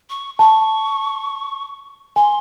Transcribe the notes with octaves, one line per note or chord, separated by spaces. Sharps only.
C#6
A5 C#6
G#5 C6